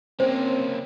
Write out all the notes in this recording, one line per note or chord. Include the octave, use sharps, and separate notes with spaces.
A#3 C4 C#4 C5